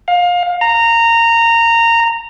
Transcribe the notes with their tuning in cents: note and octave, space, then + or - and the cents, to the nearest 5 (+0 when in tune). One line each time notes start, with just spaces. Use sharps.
F5 +25
A#5 -15